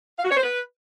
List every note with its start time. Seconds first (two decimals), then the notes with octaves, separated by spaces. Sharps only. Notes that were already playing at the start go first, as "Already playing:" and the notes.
0.18 F5
0.24 F#4
0.31 C#5
0.37 C5
0.43 B4